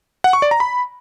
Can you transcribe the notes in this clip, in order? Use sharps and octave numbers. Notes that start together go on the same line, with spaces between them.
F#5
C#6
D5
A#5
B5